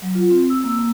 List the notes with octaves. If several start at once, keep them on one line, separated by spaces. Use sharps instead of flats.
F#3
F4
C4
E6
A#3
A#3